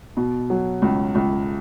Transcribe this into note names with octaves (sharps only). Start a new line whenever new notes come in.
B2
F#3
C#2
C#2